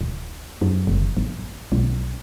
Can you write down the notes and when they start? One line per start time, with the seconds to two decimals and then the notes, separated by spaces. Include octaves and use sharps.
0.01 D1
0.61 F#2
0.87 F#1
1.17 A1
1.72 B1